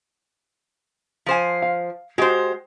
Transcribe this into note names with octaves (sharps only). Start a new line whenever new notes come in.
F3 C5 G#5
F5
G#3 F#4 G4 C5